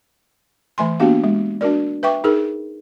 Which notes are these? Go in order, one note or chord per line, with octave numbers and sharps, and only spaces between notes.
E3 A3 G#5 C6
A#3 B3 D4 F#4 G4 F5
G#3
D4 F#4 A#4 D5
B4 E5 G5 C#6 D6
D#4 G#4 A#4